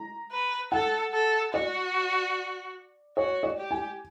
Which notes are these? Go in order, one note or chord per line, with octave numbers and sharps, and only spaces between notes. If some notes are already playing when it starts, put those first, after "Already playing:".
Already playing: A#5
B4
A4 F#5
A4
F#4 D5
F#4 C#5
D5
G4
G#5